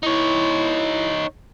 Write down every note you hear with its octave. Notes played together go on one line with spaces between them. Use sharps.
D#4 E4 C#5